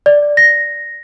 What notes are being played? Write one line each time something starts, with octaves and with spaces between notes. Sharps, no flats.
D5
A#6